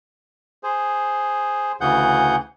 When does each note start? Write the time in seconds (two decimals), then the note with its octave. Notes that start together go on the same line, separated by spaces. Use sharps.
0.63 G#4 C5
1.81 D2 C#3 E3 G#4 F#5 G6